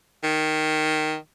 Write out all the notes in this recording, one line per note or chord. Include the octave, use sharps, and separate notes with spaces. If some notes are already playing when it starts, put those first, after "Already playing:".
D#3